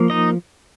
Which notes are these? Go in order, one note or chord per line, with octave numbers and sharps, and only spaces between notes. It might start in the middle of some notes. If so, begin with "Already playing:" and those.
Already playing: F3 A#3
D#4 D#5